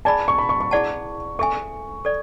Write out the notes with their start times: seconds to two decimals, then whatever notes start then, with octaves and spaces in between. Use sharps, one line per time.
0.05 G#4 D5 G#5 A5 B5
0.28 C#6
0.38 B5
0.49 C#6
0.60 C#6
0.71 E4 G#4 D5 F#5 A5
1.39 A4 E5 G#5 C#6
2.05 A4 D5